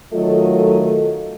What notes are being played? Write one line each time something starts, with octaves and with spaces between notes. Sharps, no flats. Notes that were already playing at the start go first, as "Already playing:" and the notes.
D#3 F#3 A3 F4 A4 D#5